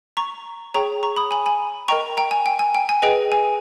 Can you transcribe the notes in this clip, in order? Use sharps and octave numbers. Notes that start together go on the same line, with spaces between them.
A#5 C#6
G#4 C#5 G5 A#5 C#6
A#5 C#6
B5 D#6
G#5 B5
G#5 B5
A#4 D#5 G5 A#5 C#6
G5 A#5
G#5
G5
G#5
G5
G#5
G#4 B4 D#5 G5
G#5